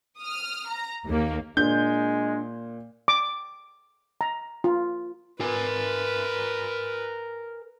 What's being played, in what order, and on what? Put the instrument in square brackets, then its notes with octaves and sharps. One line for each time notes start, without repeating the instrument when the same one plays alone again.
[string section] D#6 F6
A#5
D#2 A#3
[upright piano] A#2 [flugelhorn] G#3 [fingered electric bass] D4 [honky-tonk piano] G6
[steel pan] D6
A#5
F4
[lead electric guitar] A#4 G#5 [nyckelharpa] B4